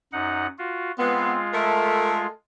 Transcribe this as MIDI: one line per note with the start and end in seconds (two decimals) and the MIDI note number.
0.13 0.47 42
0.13 0.47 63
0.13 0.47 78
0.58 0.92 65
0.58 0.92 66
0.99 2.26 56
0.99 1.36 59
0.99 1.40 60
0.99 2.26 65
1.54 2.28 57
1.54 2.32 69
1.54 2.28 70